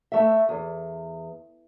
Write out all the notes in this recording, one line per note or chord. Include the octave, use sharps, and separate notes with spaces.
A3 E5
E2